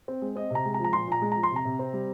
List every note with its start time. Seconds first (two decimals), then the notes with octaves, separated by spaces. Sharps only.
0.08 C4
0.22 G#3
0.36 C4 D#5
0.50 C3 A#5
0.65 G#3
0.74 A#5
0.79 F3
0.84 A#5
0.93 A#2 C6
1.07 A#2 A#5
1.22 G#3
1.32 F3 A#5
1.43 C6
1.51 C3
1.56 A#5
1.65 C3
1.79 C4
1.93 G3